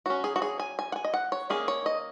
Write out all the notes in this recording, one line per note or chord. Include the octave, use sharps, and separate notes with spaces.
F#3 C#4 F#4
G#4
F#4
G#4
G#5
G#5
F#5
G#5
D#5
F#5
C#5
D#3 A#3 C#4 G#4
C#5
D#5